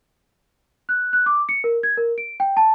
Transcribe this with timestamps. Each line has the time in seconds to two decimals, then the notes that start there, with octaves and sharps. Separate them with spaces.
0.89 F#6
1.13 F#6
1.26 D6
1.49 C#7
1.64 A#4
1.83 G#6
1.97 A#4
2.18 D7
2.40 G5
2.57 A5